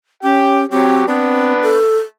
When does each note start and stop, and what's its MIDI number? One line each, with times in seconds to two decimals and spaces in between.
0.23 0.65 61
0.23 0.62 67
0.23 0.62 79
0.71 1.03 54
0.71 1.04 60
0.71 1.03 67
0.71 1.03 73
1.07 1.78 59
1.07 1.53 60
1.07 1.78 62
1.07 1.78 71
1.63 1.97 69